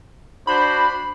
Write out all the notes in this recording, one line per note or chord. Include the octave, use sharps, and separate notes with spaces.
D4 F#4 C5 B5